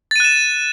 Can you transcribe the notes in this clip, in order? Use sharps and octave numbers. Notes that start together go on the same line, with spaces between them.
F#6 A6 D#7 E7